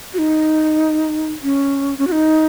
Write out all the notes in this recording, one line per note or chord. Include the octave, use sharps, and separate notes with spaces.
F#4
D#4
C#4
C#4
F#4
D#4